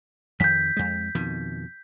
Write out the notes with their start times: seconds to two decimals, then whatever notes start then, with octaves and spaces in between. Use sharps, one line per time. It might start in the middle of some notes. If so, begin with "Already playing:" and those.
0.40 F2 D#3 G6 B6
0.77 F2 G#3
1.15 F2 B2 D#3